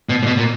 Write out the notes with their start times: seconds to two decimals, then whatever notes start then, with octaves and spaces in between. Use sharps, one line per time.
0.09 B2
0.23 A#2
0.26 B2
0.37 A#2